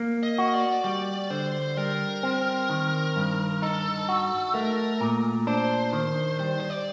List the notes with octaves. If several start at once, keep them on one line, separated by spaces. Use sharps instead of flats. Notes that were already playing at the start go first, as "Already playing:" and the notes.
Already playing: A#3
D#5
F#4
D5
G3 D5
D3 C5
G3 A#4
C4
D#3
G2
D#4 A4
F#4
A3 A#4
A#2
D4 C5
D#3 C5
G3 C5
C5
D5